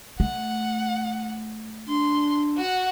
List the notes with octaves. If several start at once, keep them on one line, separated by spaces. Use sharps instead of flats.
A3 F#5
D4 C6
F#4 F#5